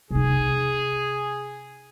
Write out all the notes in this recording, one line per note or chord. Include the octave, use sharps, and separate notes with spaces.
C3 D#4 G#4